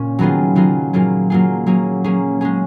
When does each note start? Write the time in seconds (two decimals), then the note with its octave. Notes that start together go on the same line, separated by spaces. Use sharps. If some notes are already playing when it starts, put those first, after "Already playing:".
Already playing: A#2 C#4
0.19 D#3 F#3 B3 F4 G#4
0.55 D#3 F#3 B3 F4 G#4
0.93 A#2 F#3 A#3 F4 G#4
1.30 A#2 F#3 A#3 F4 G#4
1.66 F#3 A#3 C#4 G#4
2.04 F#3 A#3 C#4 G#4
2.41 G#3 C#4 G#4